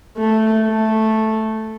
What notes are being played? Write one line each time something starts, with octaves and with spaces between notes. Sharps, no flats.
A3
A3